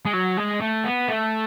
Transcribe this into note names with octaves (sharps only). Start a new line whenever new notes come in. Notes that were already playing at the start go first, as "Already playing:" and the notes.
G#3
F#3
G#3
A3
B3
A3